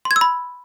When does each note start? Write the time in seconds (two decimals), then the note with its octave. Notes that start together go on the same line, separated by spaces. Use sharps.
0.05 C6
0.11 G#6
0.16 E6
0.21 B5